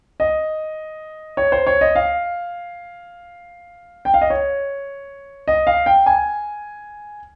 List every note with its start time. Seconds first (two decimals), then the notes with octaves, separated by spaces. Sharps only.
0.20 D#5
1.37 C#5
1.52 C5
1.67 C#5
1.81 D#5
1.95 F5
4.05 G5
4.14 F5
4.21 D#5
4.30 C#5
5.48 D#5
5.67 F5
5.86 G5
6.06 G#5